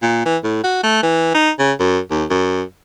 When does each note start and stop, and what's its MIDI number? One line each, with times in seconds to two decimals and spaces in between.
0.02 0.22 46
0.26 0.37 52
0.44 0.61 45
0.64 0.81 66
0.83 1.02 57
1.03 1.34 52
1.34 1.50 63
1.59 1.72 49
1.80 1.99 42
2.11 2.25 39
2.30 2.63 42